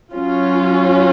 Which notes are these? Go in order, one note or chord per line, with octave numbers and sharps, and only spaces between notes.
F#3 C#4 F4